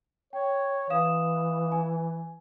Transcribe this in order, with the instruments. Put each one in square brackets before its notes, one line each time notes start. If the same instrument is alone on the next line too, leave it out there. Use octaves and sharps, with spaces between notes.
[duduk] C#5 [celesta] G5
[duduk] E3 [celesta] F5 D#6 E7
[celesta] G#5